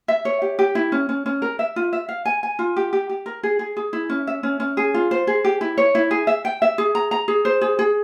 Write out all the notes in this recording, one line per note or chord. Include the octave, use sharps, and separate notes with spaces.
E5
C#5
G4
G4
E4
C#4
C#4
C#4
A#4
E5
F4
E5
F5
G#5
G#5
F4
G4
G4
G4
A#4
G#4
G#4
G#4
E4
C#4
E5
C#4
C#4
G#4
F4
C5
G#4
G4
E4
C#5
E4
G#4
E5
G5
E5
G#4
A#5
A#5
G#4
C5
G#4
G#4